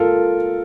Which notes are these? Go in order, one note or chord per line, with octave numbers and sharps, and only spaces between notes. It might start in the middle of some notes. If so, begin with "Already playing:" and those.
Already playing: F4 A4 A#4